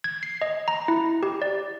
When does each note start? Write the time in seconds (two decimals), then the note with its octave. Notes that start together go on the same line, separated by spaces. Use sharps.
0.04 G#6
0.23 C7
0.42 D#5
0.68 A#5
0.88 E4
1.23 G4
1.42 D5